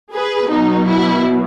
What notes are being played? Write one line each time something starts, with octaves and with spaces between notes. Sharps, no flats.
G#4 B4
B2 F#3 D#4
E4